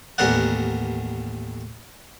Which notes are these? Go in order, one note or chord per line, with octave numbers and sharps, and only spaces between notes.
A1 D#2 B3 A#4 D5 F#5